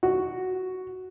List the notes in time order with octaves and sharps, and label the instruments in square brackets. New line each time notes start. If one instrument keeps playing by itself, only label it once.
[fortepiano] F#4